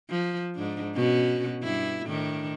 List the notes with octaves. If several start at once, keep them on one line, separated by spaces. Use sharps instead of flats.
F3
G#2 D4
B2 C#4 F#4
G2 E4
A2 D#3 D4